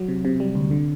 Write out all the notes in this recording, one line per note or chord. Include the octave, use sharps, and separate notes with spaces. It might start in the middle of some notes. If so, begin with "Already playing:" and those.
Already playing: F#3
C3
C3
G3
D2
D3